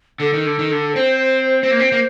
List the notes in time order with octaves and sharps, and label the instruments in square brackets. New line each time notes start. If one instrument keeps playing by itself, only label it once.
[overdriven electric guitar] D3 [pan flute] A4
[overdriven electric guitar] D#3
D3
D#3
D3
[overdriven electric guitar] C4 [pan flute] C5
[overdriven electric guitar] C4
A#3
C4
A#3